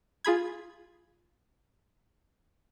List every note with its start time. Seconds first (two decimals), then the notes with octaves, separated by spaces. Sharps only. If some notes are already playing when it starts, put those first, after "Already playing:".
0.25 F4 G#4 B5 G#6